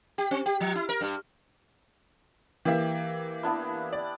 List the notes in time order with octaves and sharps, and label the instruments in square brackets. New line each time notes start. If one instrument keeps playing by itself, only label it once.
[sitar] G4
C4
G4
F3
E4
A#4
G2
[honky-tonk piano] E3 A#3 [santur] G4 E5
[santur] B3 D4 E4
[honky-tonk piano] D5